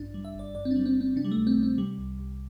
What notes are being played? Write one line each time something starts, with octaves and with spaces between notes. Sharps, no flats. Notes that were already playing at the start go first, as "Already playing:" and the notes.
Already playing: A1 G2 D4
G3
E5
G1
D5
G2 D5
C4
G3 D4
C4
G1
C4
C3 D4
G3
A3
D2
C4
D2
C4
C3 G3
C2
C2